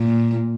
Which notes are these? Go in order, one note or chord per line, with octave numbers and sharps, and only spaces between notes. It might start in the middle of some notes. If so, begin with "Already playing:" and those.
Already playing: A#2